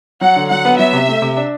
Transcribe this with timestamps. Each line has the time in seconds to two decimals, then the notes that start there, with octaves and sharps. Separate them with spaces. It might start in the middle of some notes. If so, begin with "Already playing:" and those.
0.21 F#3 F#5
0.36 D3
0.50 F#3 F#5
0.65 B3
0.79 F#3 E5
0.93 C3
1.08 A3
1.22 C3
1.37 D4